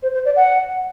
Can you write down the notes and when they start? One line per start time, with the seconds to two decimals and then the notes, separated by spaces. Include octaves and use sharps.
0.02 C5
0.13 C5
0.25 D5
0.36 F#5